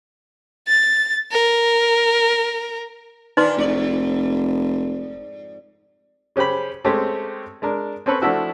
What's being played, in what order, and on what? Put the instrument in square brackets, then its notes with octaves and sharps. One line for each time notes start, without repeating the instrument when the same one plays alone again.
[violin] A6
A#4
[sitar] D#2 A#2 D4 [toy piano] D#4 B4 C6
[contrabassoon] F1 [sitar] F2 G#2 D5
[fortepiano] C#3 C#4 G4 C5 B5
G#3 A3 C4 C#4 G4
G#3 D4 A#4
C4 C#4 A4 B4 C#5
F3 A3 D4 E4 F#4